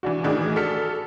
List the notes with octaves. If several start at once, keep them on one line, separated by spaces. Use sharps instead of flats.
E3 D4 F#4
A2 D#3 E3 D4 F#4 G#4
F#4 A4 F6 B6 C#7